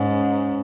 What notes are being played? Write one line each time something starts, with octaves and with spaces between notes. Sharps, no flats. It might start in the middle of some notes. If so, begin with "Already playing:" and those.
Already playing: G#2 C#4